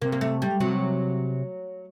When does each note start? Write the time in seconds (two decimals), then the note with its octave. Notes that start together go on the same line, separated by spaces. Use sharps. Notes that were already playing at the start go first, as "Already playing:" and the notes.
0.02 C3 A#3
0.12 A#3
0.21 A3
0.42 G3
0.60 C3 F#3